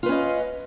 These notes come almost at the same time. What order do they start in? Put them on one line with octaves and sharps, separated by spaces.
F4 B4 C#4 D#5